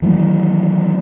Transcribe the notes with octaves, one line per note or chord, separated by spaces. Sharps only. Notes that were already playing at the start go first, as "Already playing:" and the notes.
D#3 E3 F#3 A3